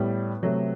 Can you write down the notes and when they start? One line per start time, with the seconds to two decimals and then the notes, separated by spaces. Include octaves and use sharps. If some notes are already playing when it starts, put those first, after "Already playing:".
Already playing: A2 G3 B3
0.43 C3 F#3 A3